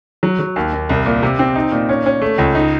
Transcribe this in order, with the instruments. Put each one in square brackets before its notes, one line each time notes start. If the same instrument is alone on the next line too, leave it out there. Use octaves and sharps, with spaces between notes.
[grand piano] F#3
F#3
D#2
D#2
C2
A#2
C3
C4
D#4
A#2
C#4
C#4
A3
C#2
D#4